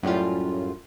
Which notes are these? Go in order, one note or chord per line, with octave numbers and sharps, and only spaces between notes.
F#2 A2 G3 F4